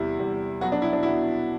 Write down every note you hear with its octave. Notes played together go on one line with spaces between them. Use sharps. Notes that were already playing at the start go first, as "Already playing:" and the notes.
Already playing: E2 C3 G3 E4
E2 C3 G3
B2 F#3 B3 F#4
D4
E4
D4
B2 F#3 B3 E4